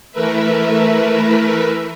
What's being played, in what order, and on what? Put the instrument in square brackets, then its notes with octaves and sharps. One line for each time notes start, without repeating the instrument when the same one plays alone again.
[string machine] E3 A3 A#4 B4 E5